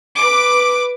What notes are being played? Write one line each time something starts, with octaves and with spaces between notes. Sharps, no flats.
B4 D6